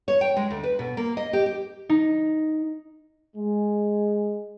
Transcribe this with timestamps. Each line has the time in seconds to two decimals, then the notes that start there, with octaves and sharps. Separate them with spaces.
0.08 C#5
0.21 G5
0.36 G#3
0.50 D2
0.64 B4
0.79 B2
0.97 A#3
1.17 D#5
1.33 G4
1.46 G4
1.89 D#4
3.35 G#3